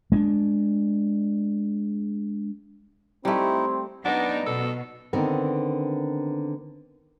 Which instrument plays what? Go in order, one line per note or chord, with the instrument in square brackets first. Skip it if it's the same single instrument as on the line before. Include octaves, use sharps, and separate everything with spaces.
[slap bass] G#3 C4 D4
[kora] G3 A3 [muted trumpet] C4 [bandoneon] D#4 E4
[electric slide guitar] F#2 B4 D5 [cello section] B3 D#4 [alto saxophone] D4 [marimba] F#5
[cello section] B2 [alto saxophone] A4
[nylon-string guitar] D3 D#3 B3 C4 A#4